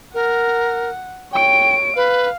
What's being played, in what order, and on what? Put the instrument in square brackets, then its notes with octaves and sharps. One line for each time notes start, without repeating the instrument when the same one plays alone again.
[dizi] A#4 [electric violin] F#5
[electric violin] C#5 D7 [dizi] G5
[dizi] B4 [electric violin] F5